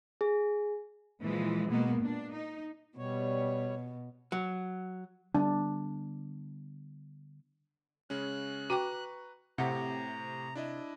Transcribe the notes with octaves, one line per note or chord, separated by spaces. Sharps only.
G#4
A#2 E3 F3 G#3
B2 G#3 A#3 B3
A#2 D4
D#4
B2 G3 C#5
F#3
D3 G3 B3 D4
C#3 G#3 C#4 F#6
F#4 B4 G5 A#5 C#6 D6
A2 C3 G4 F#5 A#5
D4 E4 D#5